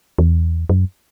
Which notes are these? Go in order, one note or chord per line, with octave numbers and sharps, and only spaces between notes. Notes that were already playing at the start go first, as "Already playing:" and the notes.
E2
F#2